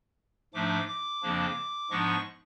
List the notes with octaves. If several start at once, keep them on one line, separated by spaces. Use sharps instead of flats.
G#2 F3 A3 D4 D6
D6
F2 C#3 F3 A#3 D4
G#2 F3 G#3 B3 D4 C#6